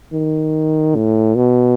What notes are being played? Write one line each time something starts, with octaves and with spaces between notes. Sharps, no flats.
D#3
A2
B2